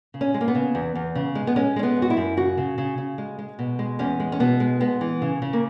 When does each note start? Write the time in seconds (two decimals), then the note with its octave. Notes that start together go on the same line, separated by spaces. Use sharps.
0.14 C#3
0.21 C#4
0.34 G#3
0.41 A#3
0.48 B3
0.55 C#3
0.75 E2
0.95 E2
1.15 C#3
1.35 G#3
1.47 B3
1.56 G#3 C#4
1.76 G#3 C#4
1.83 B3
1.97 F#2
2.02 F#4
2.10 E4
2.17 F#2
2.37 C#3 F#4
2.57 C#3
2.78 C#3
2.98 C#3
3.18 G#3
3.39 G#3
3.59 B2
3.79 G#3
3.99 E2 C#4
4.20 G#3
4.32 C#4
4.40 B2 B3
4.60 G#3
4.80 G#3 B3
5.01 E3
5.22 C#3
5.42 C#3
5.53 A#3